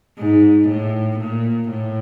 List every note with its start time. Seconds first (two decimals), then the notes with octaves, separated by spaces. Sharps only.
0.18 G#2
0.69 A2
1.19 A#2
1.69 A2